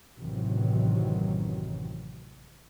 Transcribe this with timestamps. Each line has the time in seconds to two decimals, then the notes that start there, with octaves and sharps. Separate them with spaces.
0.18 A1 F#2 C3 D#3 E3 F#3